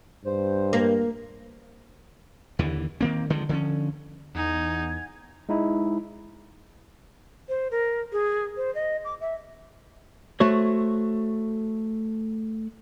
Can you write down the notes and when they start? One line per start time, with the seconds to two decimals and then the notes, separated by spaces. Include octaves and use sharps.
0.25 G2 C5
0.73 A#3
2.59 D#2 D3 E3
3.01 D#3 A#3 C4
3.30 D3 D#3 F3 G#3
3.49 D3 F3 G#3 C#4
4.35 E2 D#4 F#5 G#5 G#6
5.49 G#3 D#4 E4
7.49 C5
7.71 A#4
8.12 G#4
8.57 C5
8.75 D#5
9.05 D6
9.21 E5
10.40 A3 F#4 C5 C#5